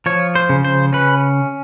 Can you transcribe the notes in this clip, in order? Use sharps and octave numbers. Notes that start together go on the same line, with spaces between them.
F3 C#5
C5
C#3
C5
C#4 B4